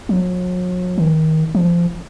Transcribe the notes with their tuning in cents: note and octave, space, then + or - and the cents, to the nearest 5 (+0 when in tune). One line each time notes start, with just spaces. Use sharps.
F#3 -40
D#3 +25
F3 -20